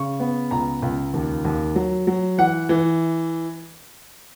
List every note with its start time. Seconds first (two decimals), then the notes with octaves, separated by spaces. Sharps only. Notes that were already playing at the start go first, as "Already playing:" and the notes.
Already playing: C#3 C#6
0.20 B3
0.51 C#2 A#5
0.82 C#2
1.14 D#2
1.45 D#2
1.76 F#3
2.07 F#3
2.38 E3 F#5
2.69 E3